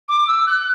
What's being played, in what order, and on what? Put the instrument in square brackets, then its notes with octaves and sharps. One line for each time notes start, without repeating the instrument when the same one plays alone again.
[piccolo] D6
E6
F#6